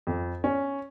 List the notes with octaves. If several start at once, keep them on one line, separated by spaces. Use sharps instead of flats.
F2
C#4